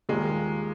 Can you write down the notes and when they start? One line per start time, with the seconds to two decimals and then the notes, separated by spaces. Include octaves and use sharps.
0.09 D#2 D#3 G3 G#3 A#3 F4